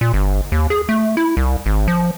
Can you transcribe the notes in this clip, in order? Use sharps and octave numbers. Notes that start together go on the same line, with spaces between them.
A#2
G1
D#2
G#4
A3
E4
C2
G#1
F3